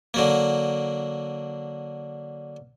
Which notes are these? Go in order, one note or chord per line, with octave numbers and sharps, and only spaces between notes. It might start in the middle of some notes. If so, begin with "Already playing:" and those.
D3 F#3 A#3